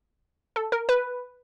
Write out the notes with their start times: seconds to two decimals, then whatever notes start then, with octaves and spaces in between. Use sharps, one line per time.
0.56 A4
0.72 A#4
0.89 B4